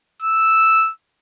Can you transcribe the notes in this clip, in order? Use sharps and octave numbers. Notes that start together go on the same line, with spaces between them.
E6